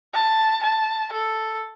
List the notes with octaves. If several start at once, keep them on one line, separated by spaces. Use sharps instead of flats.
A5
A5
A4